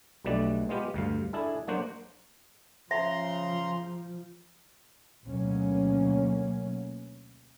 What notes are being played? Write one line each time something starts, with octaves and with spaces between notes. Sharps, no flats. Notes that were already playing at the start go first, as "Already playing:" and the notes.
B1 B2 G3 A3 D4 D5
G#3 B3 F4 G4
D2 G2 F5
D4 E4 G#4 A4
F#3 A#3 D4 F#4 C5
C#3 F3 E5 A#5 C6
D2 B2 F#3 A#3 C#4